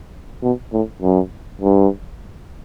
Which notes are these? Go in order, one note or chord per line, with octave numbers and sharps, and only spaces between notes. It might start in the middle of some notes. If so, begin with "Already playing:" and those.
B2
A2
F#2
G2